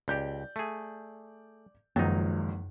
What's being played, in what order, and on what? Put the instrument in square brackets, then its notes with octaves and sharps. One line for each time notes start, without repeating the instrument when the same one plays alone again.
[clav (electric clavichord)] C#2 G4 [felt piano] D5 G6
[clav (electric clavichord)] A3 G#4
[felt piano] G#1 C#2 [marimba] F#2 [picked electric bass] F3 A#3 [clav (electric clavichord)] F#3 D#4